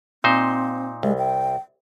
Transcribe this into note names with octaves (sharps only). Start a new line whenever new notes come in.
A#2 C4 D#4 C5
C2 G#3
G5